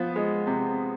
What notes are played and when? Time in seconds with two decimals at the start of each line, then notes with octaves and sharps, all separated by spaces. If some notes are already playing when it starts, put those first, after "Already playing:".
Already playing: F3 B3
0.16 G#3
0.47 C3